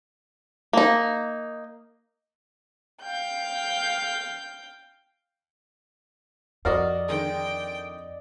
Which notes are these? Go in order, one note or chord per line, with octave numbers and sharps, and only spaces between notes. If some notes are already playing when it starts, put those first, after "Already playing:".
A#3 D#4
F5 G5 G6
F2 F#4 A#4 D5 D#5 F5
D3 D#3 G#3 G5